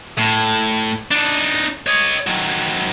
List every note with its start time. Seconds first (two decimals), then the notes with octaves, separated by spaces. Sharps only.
0.18 A2
1.11 D4 D#4
1.87 C#5 D#5
2.27 D#3 F#3